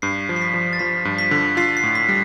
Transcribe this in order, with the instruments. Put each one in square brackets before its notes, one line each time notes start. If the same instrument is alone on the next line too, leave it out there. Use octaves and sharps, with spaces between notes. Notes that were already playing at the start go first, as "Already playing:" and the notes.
[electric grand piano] G2 [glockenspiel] C7
[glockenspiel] B6
C7
[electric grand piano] F3
[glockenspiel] C7
B6
[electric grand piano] F3
[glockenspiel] A6
[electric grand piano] F3 [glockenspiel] B6
[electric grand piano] G2
[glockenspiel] B6
[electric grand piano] D3
[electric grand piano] F4 [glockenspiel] C7
[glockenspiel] C7
[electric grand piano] A2
[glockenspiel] B6
[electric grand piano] G3